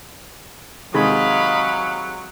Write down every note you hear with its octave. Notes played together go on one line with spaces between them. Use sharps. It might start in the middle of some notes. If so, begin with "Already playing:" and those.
C3 D#3 F#3 G#3 D#5 F5 B5